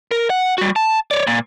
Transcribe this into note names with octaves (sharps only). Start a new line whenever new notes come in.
A#4
F#5
G3 F#4
A5
C#5 D5
A#2